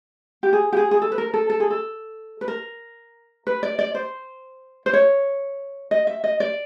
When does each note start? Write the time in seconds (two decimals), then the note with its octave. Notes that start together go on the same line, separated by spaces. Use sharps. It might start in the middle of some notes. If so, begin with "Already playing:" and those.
0.43 G4
0.53 G#4
0.73 G4
0.77 G#4
0.91 G#4
1.02 A4
1.12 B4
1.18 A#4
1.34 A4
1.50 A4
1.60 G#4
1.70 A4
2.41 B4
2.48 A#4
3.47 B4
3.63 D5
3.79 D5
3.95 C5
4.86 C5
4.93 C#5
5.91 D#5
6.07 E5
6.24 D#5
6.40 D5